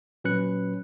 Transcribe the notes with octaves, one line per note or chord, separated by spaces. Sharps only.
A#2 F#3 C#4 B4 F#6 C#7